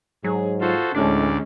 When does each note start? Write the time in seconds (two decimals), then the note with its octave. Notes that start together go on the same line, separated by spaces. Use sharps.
0.24 G#2 F#3 G#4
0.61 F4 F#4 A4 C5
0.95 D2 A2 G#3 C#4 D4 D5